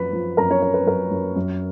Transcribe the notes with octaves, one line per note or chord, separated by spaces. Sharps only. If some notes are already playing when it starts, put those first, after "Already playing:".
Already playing: F#2 F3 B4 B5
F3
F#2 A#4 A#5
C#4 C#5
C#4 C#5
B4
F#2 A#4
F#2
F#2